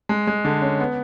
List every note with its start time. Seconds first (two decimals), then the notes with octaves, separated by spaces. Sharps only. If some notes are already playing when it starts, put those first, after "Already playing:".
0.09 G#3
0.27 G#3
0.45 D3
0.62 C#4
0.80 B3